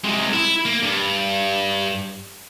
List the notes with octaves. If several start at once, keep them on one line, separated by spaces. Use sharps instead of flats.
C3 G#3
E4
A#3
G2